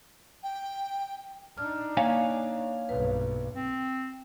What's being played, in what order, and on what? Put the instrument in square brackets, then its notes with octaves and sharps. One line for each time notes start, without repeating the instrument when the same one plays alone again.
[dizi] G5
[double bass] D4 D#4 [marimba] F6
[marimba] A#3 [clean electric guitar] C#5 F5 G#5
[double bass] B1 G2 [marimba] B4
[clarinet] C4